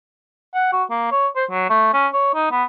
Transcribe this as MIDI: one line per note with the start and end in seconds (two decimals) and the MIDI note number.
0.54 0.68 78
0.73 0.84 66
0.90 1.08 58
1.11 1.28 73
1.36 1.45 72
1.51 1.68 54
1.70 1.89 57
1.94 2.07 61
2.13 2.32 73
2.34 2.48 63
2.51 2.64 59